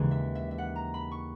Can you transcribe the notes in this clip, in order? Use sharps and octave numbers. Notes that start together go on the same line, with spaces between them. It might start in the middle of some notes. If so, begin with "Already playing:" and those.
Already playing: D#2 C#3 E3 G#3 D#4
E5
E5
E5
F#5
A#5
B5
C#6